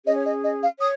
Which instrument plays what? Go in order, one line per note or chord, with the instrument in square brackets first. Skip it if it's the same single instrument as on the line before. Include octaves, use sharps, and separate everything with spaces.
[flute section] C#4 G#4 C#5 D#5
C#5
D#5
D#5
F5
C#5 D#6